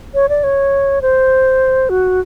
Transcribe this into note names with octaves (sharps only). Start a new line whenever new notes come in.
C#5
D5
C#5
C5
F#4